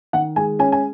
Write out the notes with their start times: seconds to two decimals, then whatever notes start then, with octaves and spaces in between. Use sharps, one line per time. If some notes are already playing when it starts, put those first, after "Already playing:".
0.13 D#3 F#5
0.36 G#3 G#5
0.59 C#4 G#5
0.72 G#5